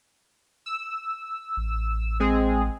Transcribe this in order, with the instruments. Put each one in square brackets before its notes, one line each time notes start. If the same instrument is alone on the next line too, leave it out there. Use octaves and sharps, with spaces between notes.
[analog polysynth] E6
[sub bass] A1
[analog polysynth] G#3 C4 G#4